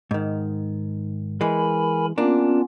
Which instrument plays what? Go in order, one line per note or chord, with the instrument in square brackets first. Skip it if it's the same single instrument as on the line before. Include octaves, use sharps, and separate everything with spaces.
[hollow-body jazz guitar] G#2 D#3
[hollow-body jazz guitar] E3 G#3 [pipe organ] A#4 G#5 B5
[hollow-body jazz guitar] A#3 D4 [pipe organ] B3 C#4 F4